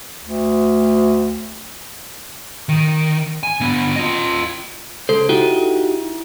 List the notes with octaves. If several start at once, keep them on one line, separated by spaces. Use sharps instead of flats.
D2
D#3
G#5
D3 B3
F4 D#5
C#2 A4 C5
D#4 E4 F#4 G4